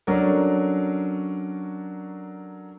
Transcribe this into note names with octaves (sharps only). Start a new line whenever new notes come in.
F#3 C#4 D4 A4 A#4